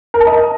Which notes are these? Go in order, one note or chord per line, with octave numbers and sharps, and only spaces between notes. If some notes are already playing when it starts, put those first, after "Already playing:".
A#4
A5
D#5